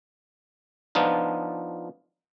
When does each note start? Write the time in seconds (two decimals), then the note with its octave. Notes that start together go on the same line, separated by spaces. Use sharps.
0.95 F3 B3 D4 D#4 F4